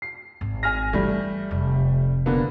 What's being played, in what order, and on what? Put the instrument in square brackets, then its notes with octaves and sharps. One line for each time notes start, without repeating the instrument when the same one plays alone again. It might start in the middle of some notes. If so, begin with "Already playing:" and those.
[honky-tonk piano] C7
[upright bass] G#1
[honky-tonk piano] G#5 F6 A#6
[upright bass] E3 [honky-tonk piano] G3 A3
[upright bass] F1
[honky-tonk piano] D3 A#3 B3